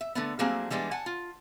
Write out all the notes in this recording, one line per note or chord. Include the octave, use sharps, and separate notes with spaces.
E5
D3 A3 B3
F#3 G3 A3 A#3 C4 G#4
E3 G3 G#3 B3 D4
F#5 G#5 A5
F4